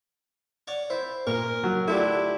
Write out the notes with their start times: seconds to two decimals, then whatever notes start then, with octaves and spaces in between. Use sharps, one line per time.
0.67 C#5 D5 F#5
0.90 E4 C5
1.27 A#2 A#4 C#6
1.63 F#3
1.88 D3 A3 D4 E4 F4 G4 E5